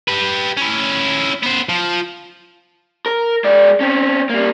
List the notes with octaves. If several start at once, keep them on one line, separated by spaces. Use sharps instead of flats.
G4 B4
C#4 E4
B3 C5
F3
A#4
G#3 D5
C4 C#4
G3 A#3